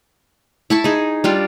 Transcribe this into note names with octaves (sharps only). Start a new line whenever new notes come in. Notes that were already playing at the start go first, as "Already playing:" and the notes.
E4 A5 C#6
D#4 G#4
G3 D4 F4